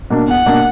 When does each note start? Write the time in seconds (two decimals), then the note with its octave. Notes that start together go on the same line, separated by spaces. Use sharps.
0.10 B2 A#3 D4
0.28 E2 F#5
0.46 B2 A#3 D4